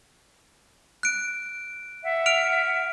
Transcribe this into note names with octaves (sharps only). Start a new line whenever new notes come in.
F#6 D7
E5 F#5
F6 D7 F7